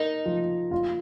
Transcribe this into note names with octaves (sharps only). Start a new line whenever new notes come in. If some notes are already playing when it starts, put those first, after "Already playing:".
Already playing: D#4 A#4
F3
F4